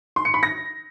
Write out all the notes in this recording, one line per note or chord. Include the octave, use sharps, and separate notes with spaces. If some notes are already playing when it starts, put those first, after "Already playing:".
C6
C#7
B5
A#6